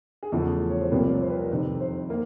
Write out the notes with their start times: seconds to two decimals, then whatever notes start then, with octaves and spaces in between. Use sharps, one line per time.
0.23 G#4
0.32 E2 C#3 F3 A3 A4
0.70 C#5
0.81 C5
0.91 C2 C3 F3 A#3 B4
1.06 C#5
1.21 C5
1.30 B4
1.39 A#4
1.49 F2 C3 D#3 B4
1.80 C5
2.10 A#3